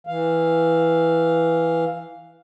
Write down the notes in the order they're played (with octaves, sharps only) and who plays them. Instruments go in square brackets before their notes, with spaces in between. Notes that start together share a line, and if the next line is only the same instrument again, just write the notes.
[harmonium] E3 F5